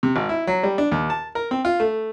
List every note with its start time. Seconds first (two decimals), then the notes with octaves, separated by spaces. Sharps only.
0.03 C3
0.16 G#1
0.29 E4
0.47 F#3
0.63 G3
0.78 D4
0.92 D#2
1.10 A5
1.35 A#4
1.51 C4
1.65 F4
1.80 A3